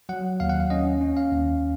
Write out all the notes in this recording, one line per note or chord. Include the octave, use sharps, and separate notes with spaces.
F#3 F#5
D#2 F5
F#5
F5
C#4 D#5
C#4
F5
D#2